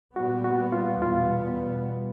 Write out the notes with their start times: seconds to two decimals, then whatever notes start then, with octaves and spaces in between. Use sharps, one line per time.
0.15 A#2 G3 B3 F#4
0.44 F#4
0.72 F4
1.01 E2 B2 G3 B3 F4